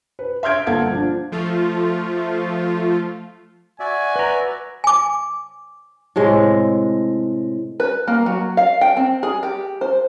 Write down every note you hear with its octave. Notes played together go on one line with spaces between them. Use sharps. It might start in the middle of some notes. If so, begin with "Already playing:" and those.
B4
E5 C6 F6 G6 G#6 D7
G1 A#3 A4 F5 F#5 G#6
F3 D4
F3 A3 F4
F#4 D5 E5 G#5
B4 A#5
G#5 D6
A2 C3 G#3
B4
A#3
F#3
F5
G5
C4
G#4
G4
C5